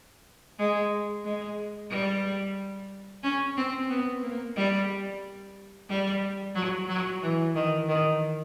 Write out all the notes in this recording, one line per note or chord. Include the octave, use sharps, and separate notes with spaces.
G#3
G#3
G3
C#4
C4
B3
A#3
G3
G3
F#3
F#3
E3
D#3
D#3